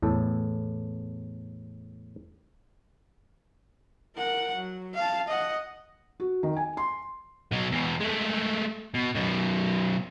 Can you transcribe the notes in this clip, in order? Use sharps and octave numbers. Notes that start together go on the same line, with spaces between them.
E2 A2 A4
A#4 F#5
F#3
F5 A5
D#5 F#5
F#4
D#3
G#5
C6
B2 F#3
E2 B2
G#3 A3
B2
F#2 B2